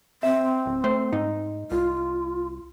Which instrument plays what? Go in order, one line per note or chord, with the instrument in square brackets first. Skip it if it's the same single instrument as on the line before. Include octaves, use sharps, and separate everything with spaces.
[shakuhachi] C4 [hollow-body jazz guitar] E5
[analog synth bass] D1
[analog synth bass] A3 [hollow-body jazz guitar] C5
[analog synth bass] G#2 [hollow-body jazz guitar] D#4
[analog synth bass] C2 [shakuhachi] F4